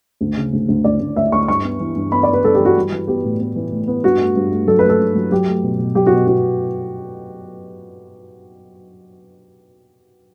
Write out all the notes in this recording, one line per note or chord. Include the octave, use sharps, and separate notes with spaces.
D2
C#3
D2
D2
D2 D5
D2
D2 E5
D2 C#6
G2 C#6
B3
E3
G2
B3 B5
D5
B3
B4
G2 A4
G4
E3 F#4
G3
E3
B3 G4
A2
B3
E3
A2
B3
G2 F#4
A3
G2
A3
F#3 A4
B4
A3
A4
G2
F#3
F#3 G4
A3
B2
B2
F#3 G4
F#4
B2
B2 F#4